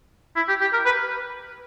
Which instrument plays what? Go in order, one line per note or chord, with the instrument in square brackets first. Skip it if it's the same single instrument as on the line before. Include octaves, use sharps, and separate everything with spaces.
[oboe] E4
G4
G4
A#4
B4